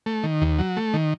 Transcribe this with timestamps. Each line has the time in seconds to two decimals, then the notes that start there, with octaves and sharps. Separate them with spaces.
0.06 A3
0.23 D#3
0.42 D#2
0.59 F#3
0.77 A3
0.94 D#3